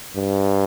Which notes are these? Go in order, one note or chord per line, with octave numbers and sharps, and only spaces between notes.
G2